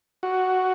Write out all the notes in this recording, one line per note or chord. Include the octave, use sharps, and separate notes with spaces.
F#4